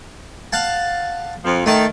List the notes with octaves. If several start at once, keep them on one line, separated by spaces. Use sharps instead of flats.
F5 F#5 A5
F2 F3
D#3 A3 A5